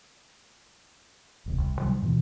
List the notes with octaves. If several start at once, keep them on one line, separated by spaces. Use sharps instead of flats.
E1 D#2 C3
C2
C3 D#3 F#3 G3
F#2 B2 E3